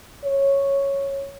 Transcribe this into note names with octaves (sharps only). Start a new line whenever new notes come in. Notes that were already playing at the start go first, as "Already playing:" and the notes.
C#5